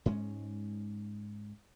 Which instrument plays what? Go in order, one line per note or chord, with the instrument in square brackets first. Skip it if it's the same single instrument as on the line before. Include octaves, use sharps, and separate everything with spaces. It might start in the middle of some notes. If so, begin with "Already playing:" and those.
[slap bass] G#2 G#3 C#4